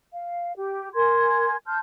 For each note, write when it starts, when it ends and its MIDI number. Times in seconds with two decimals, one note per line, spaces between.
0.14 0.55 77
0.57 0.89 67
0.94 1.56 70
0.94 1.56 80
0.94 1.56 84
0.94 1.56 92
1.66 1.79 81
1.66 1.79 84
1.66 1.79 89
1.66 1.79 91